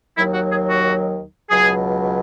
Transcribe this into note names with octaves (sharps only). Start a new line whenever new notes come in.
D#2 D#3 F#3 E4
F#4
G#4
F#4
C#2 B2 F#3 G#4